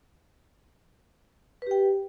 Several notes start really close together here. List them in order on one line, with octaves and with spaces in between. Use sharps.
B4 G4 G5